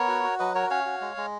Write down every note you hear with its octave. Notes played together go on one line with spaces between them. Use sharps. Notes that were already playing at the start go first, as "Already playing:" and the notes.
Already playing: B3 A#4 C#5
F#4
F#4
F#3 B4 D#5
F#4 A#4 C#5
C#4 C#5 F5
F#4
G#3
G#3